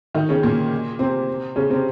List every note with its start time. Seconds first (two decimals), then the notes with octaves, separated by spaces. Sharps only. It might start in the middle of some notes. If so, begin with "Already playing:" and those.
0.14 D#3 D#4
0.29 C#3 C#4
0.43 A#2 A#3
0.99 C3 C4
1.56 C#3 C#4
1.69 C3 C4